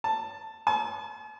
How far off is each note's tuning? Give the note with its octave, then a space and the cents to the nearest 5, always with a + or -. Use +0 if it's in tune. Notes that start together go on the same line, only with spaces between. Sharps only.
A5 +5
A5 -45